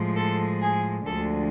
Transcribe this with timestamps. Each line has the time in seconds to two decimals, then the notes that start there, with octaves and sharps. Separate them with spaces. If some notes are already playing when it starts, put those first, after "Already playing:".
Already playing: A2 F3 G#3
0.15 A4
0.61 G#4
1.05 D2 D3 F3 G#3 A4